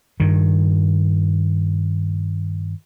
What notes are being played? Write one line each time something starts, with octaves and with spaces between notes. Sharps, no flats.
G2 D#3